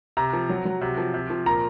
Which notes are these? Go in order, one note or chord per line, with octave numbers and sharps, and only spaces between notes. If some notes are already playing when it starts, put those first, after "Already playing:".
C3 A#5
F3
F#3
F#3
C3
F3
C3
F3
A#2 A#5